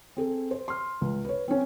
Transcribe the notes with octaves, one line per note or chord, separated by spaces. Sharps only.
C4 G#4 A4
C5
C6 F6
C#2
B4 C#5
C4 C#4